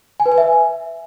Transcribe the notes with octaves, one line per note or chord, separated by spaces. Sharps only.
G#5
B4
G#5
E5